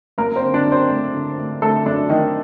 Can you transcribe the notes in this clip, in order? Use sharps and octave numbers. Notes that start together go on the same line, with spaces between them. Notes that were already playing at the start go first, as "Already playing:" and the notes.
F#2 A#3 A#4
C4 C5
D3
D4 D5
F#2
C4 C5
A3
D3
A3
D3 A3 A4
F#2 D4
D#3 A3 D#4